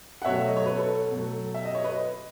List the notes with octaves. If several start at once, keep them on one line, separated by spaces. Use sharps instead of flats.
F#5
B2 F#3 A3 C#5 E5
D#5
C#5
B4
A4 C#5
B2 F#3 A3
E5
D#5
C#5
B4 D#5